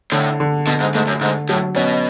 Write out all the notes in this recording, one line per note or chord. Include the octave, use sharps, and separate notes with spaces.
A2 D3
D3
B2 D3
G#2
G#2 A3
F#2
G#2 D3
A2 F#3
B2 C#4